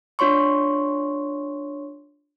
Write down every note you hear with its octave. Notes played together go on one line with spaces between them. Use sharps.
D4 F4 C#5 C6 C#6